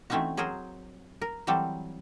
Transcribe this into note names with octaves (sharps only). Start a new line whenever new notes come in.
E3 A3 C4 C#4 D#4 F#4
F#3 G#4 A#4 C5
A#4
E3 F#3 G3 C4 A4